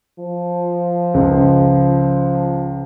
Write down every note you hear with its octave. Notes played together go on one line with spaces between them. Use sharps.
F3
C#2